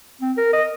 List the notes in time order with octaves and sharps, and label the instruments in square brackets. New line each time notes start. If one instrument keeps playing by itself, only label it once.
[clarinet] C4
A#4
D#5